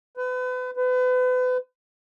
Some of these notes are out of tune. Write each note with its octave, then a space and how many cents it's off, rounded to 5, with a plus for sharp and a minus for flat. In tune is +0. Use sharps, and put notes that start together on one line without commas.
B4 +35
B4 +35